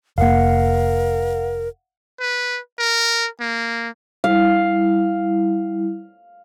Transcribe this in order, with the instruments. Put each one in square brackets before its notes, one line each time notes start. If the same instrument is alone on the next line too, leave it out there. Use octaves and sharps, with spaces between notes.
[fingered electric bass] F1 A#3 [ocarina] A#4 [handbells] F5 F#5
[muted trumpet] B4
A#4
A#3
[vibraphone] G3 E4 [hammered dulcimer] F5